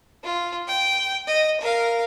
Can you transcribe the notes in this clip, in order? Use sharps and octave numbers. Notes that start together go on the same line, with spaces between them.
F4
G5
D#5
A#4 F5